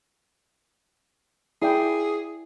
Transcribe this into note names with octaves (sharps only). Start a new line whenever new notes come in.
E4 G#4 D5 G5